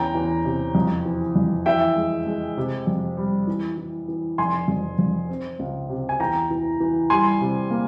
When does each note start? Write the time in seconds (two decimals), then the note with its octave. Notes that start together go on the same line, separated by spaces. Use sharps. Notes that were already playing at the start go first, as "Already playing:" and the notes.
Already playing: E2 C#4 G5 A#5
0.15 E2
0.45 C3
0.75 F2
1.06 E3
1.36 F2
1.66 E3 E5 G5
1.96 G#3
2.26 G#3
2.57 C3
2.87 F2
3.17 G3
3.47 E3
3.77 E3
4.08 E3
4.38 F1 G#5 C6
4.68 F2
4.99 F2
5.29 C4
5.59 C#2
5.89 C3
6.09 G#5
6.20 E2 G5 A#5
6.51 E3
6.80 E3
7.10 G3 G#5 C6
7.41 C3
7.71 A#3